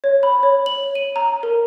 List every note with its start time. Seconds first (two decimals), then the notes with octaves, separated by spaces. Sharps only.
0.04 C#5
0.23 B5
0.43 C#5
0.66 F#7
0.95 D#7
1.16 A#5
1.43 A#4